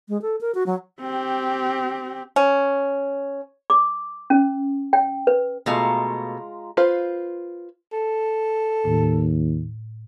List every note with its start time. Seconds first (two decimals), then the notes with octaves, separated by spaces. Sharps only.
0.09 G#3
0.22 A4
0.41 A#4
0.55 F#4
0.67 F#3
1.01 C4 G4
2.36 C#4
3.70 D6
4.30 C#4
4.93 G5
5.27 B4
5.66 B2 G#3 A3 F4 F5 A#5
6.77 F4 B4 C5
7.93 A4
8.85 D#2 A2